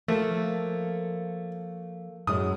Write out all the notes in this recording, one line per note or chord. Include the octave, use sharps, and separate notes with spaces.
F3 A3 A#3 A4
F#2 A2 G#3 D#6